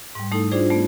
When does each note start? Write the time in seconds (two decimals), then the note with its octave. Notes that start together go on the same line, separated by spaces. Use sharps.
0.15 G#2 G3
0.31 G3 A3 D#4 E4 A4
0.51 D4 E4 F4 G#4 C5 D5
0.70 A3 B3